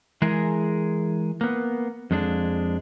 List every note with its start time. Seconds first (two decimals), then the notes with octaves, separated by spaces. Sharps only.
0.22 E3 G#3 G#4 A#4
1.41 A#3 B3
2.11 F2 G#3 D4